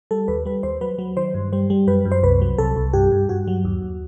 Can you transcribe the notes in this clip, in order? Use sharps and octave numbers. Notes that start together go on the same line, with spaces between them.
G3 A4
D#2 B4
G3 B4
D#2 C5
F#3 B4
F#3
D#3 C5
G2
G3 C5
G3
F#2 B4
F#2
C5
C2 B4
F#3
C2 A4
C2
G2 G4
G2
G2 F#4
F#3
D#2
D#2